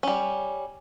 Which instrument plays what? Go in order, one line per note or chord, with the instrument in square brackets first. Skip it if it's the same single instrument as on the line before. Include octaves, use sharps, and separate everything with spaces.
[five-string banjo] G3 C#4